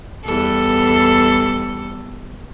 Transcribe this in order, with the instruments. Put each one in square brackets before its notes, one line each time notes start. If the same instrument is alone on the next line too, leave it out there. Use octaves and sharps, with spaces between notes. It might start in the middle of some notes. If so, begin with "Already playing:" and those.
[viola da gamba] E2 G3 A4